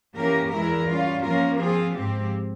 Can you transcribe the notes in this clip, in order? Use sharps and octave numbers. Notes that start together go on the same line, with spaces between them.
E3 A#3 C#4 G4 A#4
E2 E3 G#3 E4 A#4
G3 C#4 F4
F3 A#3 C#4 F4 A#4
F3 C4 F4 G#4
G#2 F3 G#3 C4 G4